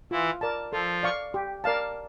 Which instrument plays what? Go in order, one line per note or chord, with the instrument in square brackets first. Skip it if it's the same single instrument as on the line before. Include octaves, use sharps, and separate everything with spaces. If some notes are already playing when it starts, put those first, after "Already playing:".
[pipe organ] E3 E4 [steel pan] F4
[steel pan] A#4 D5 A5
[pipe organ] F3 F4 [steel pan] A4
[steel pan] D5 F5 C#6
G4
A#4 D5 F5 A5